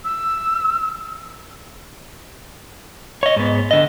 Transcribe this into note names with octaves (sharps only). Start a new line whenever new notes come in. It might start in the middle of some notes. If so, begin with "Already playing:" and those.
E6
C#5 D#5
G#2 B3
D3 D#5